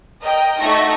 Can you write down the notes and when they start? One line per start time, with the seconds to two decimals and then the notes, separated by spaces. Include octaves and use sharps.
0.22 A#4 D#5 G5
0.60 A3 D#4 F#4 C#6 A#6